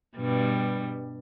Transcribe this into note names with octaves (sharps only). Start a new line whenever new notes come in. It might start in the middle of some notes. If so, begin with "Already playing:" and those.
G2 B2 G3